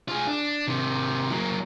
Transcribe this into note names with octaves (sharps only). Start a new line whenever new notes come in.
F4 G#4
D4
C3 D#3
F#3 A#3